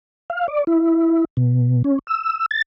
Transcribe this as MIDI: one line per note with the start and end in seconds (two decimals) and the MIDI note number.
0.30 0.47 77
0.48 0.64 74
0.67 1.25 64
1.37 1.82 47
1.84 1.99 61
2.07 2.46 88
2.51 2.62 93